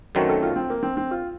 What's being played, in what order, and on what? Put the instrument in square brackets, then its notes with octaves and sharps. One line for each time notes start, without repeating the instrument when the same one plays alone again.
[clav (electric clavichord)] F#2 D#3 F#3 A3 C4 [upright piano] F#4
[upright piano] A4
F4
C4
A#3
C4
C4
F4